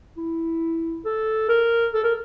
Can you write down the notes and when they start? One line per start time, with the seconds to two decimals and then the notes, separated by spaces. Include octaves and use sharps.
0.17 E4
1.05 A4
1.49 A#4
1.94 A4
2.04 A#4